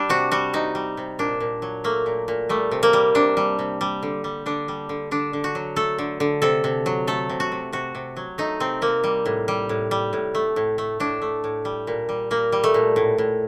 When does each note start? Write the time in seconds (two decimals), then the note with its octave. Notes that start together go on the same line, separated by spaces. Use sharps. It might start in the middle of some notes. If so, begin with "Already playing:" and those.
Already playing: G3 D4
0.09 C3 F#4
0.31 G3 F#4
0.53 C3 D#4
0.75 G3
0.97 C3
1.19 A#2 D4
1.40 A#2
1.62 F#3
1.84 A3 A#3
2.06 A#2
2.28 A#2
2.49 G3 A3
2.71 C3
2.83 A#3
2.93 G3
3.15 C3 D4
3.37 G3
3.59 C3
3.81 G3
4.02 D3
4.24 G3
4.46 D3 D4
4.68 G3
4.89 D3
5.11 D3 D4
5.33 D3
5.44 F#4
5.55 F#3
5.76 A3 A4
5.98 D3
6.20 D3
6.42 C3 A4
6.64 C3
6.86 F#3
7.07 A3 A4
7.29 C3
7.40 F#4
7.52 C3
7.72 C3 F#4
7.95 C3
8.16 F#3
8.38 A3 D#4
8.60 C3 C4
8.81 C3 A#3
9.04 G3
9.26 A2
9.48 G3
9.69 A2
9.91 G3
10.13 A2
10.35 A3
10.56 A2
10.78 A3
11.00 A2 D4
11.22 A3
11.44 A2
11.65 G3
11.87 A#2
12.09 G3
12.31 A#2 A#3
12.52 G3
12.64 A3
12.74 A#2
12.96 A2
13.18 A2